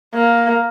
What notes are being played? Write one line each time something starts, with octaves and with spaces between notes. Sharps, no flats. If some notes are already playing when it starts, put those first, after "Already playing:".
A#3